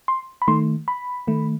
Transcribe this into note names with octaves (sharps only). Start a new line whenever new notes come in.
C6
B5
D#3 A3 C6
B5
D#3 A3